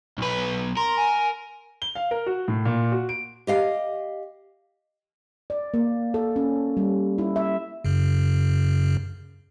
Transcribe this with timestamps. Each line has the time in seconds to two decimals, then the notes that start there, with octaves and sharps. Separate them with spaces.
0.18 B1 B4
0.77 A#4 C6
0.98 G#5
1.82 G7
1.95 F5
2.11 A#4
2.26 F#4
2.48 A2
2.65 A#2
2.92 F#4
3.09 D7
3.47 G4 D#5 F5
5.50 D5
5.74 A#3
6.14 A4
6.36 C#4
6.77 G3
7.18 E4
7.36 E5
7.85 F#2 C#3